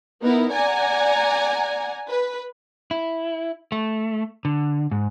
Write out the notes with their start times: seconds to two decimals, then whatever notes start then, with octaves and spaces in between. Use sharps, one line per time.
0.22 B3 D#4 E4 A#4
0.51 D5 F#5 G#5 A#5
2.09 B4
2.91 E4
3.72 A3
4.45 D3
4.91 G#2